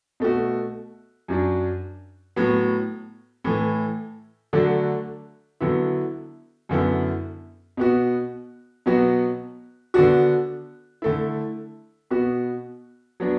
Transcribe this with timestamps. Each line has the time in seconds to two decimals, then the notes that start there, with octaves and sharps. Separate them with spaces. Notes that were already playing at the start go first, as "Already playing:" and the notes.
0.20 B2 A3 F#4
1.28 F#2 F#3 D4
2.36 A2 F#3 B3
3.44 A2 E3 A3
4.53 D3 F#3 A3 D4 F#4
5.60 D3 F#3 B3 E4
6.69 F#2 D3 B3 E4
7.77 B2 B3 F#4
8.86 B2 F#3 B3 F#4
9.94 D3 B3 D4 F#4
11.02 D3 A3 E4
12.11 B2 B3 F#4
13.20 F#3 B3 D4